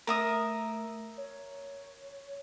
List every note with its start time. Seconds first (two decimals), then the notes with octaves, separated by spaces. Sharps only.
0.07 A3 A#4 E5 D#6
1.18 C#5